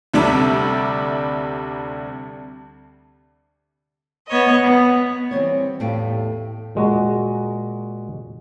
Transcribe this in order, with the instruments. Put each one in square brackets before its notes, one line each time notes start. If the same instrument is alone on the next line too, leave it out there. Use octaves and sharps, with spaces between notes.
[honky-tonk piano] D2 C3 G3 D4 D5 E5
[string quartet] B3 C#5 D#5
B3
[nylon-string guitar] E3 G3 C4 C#5
E2 A2 A3 G4 F5 G5
[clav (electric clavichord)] A#2 G#3 F#4 A#5